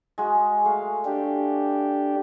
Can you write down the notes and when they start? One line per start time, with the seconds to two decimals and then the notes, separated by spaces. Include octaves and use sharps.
0.18 G#3 F#4 G#4
0.65 A3 F5
1.05 D4 G4